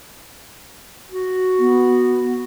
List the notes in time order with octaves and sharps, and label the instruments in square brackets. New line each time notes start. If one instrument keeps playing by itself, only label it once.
[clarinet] F#4
[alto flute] B3